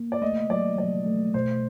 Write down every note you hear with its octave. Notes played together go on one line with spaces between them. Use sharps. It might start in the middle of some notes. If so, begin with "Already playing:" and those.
Already playing: A#3
D5
A3 D#5
F#3 D5
F#3 D5
A3
B2 C5